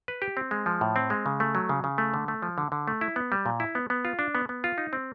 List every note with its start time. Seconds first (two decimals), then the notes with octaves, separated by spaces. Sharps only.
0.08 B4
0.22 G4
0.37 C4
0.51 G#3
0.66 F3
0.81 A2
0.96 C4
1.10 G#3
1.26 C#3
1.40 A3
1.55 F#3
1.69 C#3
1.84 C#3
1.98 A3
2.14 D3
2.28 A3
2.42 F3
2.58 D3
2.72 D3
2.88 A3
3.01 E4
3.16 B3
3.32 G3
3.46 A#2
3.60 E4
3.75 B3
3.90 B3
4.05 F4
4.19 D4
4.35 B3
4.49 B3
4.64 F4
4.78 D#4
4.93 C4